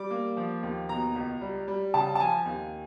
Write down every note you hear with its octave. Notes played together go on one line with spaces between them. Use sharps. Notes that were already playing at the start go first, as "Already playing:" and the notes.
Already playing: G3 D6
A#3
F3
D#2
B2 A#5
C#2
G3
G3
C#3 A5
A5
F3 G#5
D#2